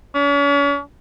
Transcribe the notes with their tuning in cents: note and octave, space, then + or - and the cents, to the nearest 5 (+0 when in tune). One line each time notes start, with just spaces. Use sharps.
C#4 +40